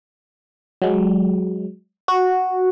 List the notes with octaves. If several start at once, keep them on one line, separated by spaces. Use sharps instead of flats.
F#3 G#3
F#4